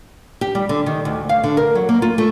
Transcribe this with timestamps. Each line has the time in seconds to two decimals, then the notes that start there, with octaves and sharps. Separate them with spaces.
0.41 G4
0.55 G3
0.69 D3
0.86 D#3
1.05 D2
1.29 F5
1.44 D3
1.57 A#4
1.75 F#3
1.89 A#3
2.02 F4
2.18 A3